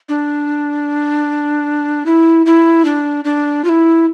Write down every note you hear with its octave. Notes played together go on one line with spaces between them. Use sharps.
D4
E4
E4
D4
D4
F4
E4